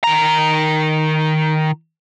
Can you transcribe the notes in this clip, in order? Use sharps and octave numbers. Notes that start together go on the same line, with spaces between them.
D#3 A#5